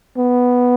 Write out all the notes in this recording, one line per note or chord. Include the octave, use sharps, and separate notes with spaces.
B3